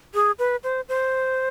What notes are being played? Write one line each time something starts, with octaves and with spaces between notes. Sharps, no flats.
G#4
B4
C5
C5